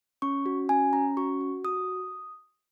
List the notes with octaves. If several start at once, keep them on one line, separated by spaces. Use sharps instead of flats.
C#4 C#6
F#4
C#4 G#5
C#4 A#5
F#4 C#6
F#4
F#4 D#6